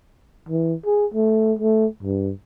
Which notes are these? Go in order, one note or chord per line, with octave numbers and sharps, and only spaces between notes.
E3
G#4
A3
A3
G2